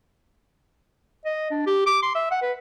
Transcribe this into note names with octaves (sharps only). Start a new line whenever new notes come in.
D#5
D4
G4
D6
C6
E5
F#5
B4